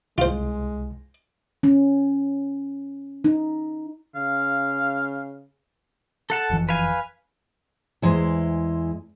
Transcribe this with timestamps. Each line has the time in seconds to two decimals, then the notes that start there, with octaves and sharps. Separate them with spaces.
0.18 C2 G#3 F4 C5
1.63 C#4
3.24 D#4
4.16 C#3 F5
6.30 A4 F#5 A5
6.50 F#1 F2 E3
6.69 B4 F5 G#5
8.02 E2 G#3 E4 C5